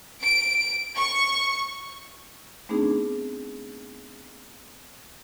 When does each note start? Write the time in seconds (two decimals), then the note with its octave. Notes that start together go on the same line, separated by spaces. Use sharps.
0.23 D7
0.96 C#6
2.69 A3 B3 C4 D4 D#4 G#4